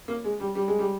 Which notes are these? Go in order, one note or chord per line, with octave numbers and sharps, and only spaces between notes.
A#3
G#3
G3
G3
G#3
G3